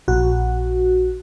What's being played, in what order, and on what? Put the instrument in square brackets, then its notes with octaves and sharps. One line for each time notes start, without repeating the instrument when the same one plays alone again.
[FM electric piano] A#1 F#4